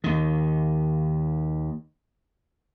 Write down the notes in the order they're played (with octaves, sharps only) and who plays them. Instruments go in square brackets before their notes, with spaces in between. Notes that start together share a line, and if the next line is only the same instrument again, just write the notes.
[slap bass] D#2 D#3